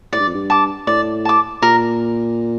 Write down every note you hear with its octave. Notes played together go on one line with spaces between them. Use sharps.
A2 D5
G2
F2
G2
A5 D6
A2 D5
A5 D6
A#2 A#4